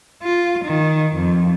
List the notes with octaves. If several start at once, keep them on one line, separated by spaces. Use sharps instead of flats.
F4
D#3
F2